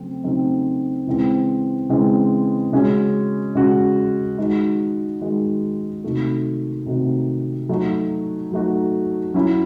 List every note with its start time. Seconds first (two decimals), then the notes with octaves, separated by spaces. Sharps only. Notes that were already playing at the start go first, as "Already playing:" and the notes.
Already playing: C#3 F#3 A3 C4
0.24 C#3 F#3 A3 C4 D#4
1.07 C#3 E3 G#3 C4
1.89 C#3 E3 G#3 C4
2.72 C#3 G#3 C#4 F#4
3.55 C#3 G#3 C#4 F#4
4.38 D#3 G#3 D#4 F#4
5.21 D#3 G#3 D#4 F#4
6.04 C3 D#3 A3 D#4 F#4
6.86 C3 D#3 A3 D#4 F#4
7.69 F#3 A3 D#4 F#4
8.52 F#3 A3 D#4 F#4
9.34 F#3 C#4 E4